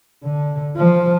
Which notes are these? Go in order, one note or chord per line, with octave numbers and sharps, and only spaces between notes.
D3
F3